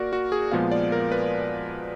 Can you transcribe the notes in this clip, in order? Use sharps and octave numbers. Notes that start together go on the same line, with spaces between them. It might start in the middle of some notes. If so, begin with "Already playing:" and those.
Already playing: A#3 F#4 A#4 D5
F#4
G#4
A#2 F3 G#3 B3 F5
D5
A#4
B4